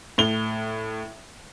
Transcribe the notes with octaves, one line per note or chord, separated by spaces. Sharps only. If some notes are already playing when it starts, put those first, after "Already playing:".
A2 F7 G7